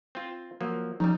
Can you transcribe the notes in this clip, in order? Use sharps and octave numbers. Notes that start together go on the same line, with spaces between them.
C4 F4
F3 F#3 A#3
C#3 F3 G3 D#4